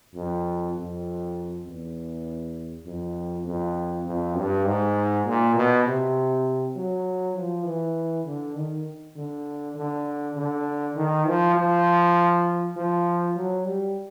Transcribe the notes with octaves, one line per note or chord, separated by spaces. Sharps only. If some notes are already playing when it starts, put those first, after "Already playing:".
F2
F2
E2
F2
F2
F2
G2
G#2
A#2
B2
C3
F#3
F3
E3
D3
D#3
D3
D3
D3
D#3
F3
F3
F3
F#3
G3